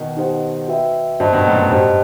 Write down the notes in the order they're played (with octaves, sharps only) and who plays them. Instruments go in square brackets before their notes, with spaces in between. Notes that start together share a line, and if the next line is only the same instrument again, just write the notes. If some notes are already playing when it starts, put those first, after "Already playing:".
Already playing: [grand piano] B2 D#3
[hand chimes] D#4 G4 C5 F#5
F#4 B4 E5 G5
[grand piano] G2 [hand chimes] F#4 C5 D#5 A5
[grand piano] G2 B2
F#2 A2
F#2 A2
[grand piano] G2 [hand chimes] G4 C5 D#5 A5